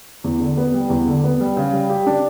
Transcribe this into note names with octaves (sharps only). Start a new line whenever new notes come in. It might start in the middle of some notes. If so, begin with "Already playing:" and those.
E2
D3
B3
G3
E2
D3
B3
G3
C#3
G3
G4
D4